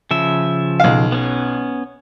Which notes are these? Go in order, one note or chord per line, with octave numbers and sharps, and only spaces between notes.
C#3 F3 E5
B1 F5
B3 C#4